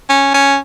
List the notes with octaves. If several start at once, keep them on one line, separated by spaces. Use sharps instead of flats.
C#4
C#4